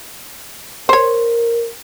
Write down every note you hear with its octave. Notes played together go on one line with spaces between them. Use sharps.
A#4 C5 C#5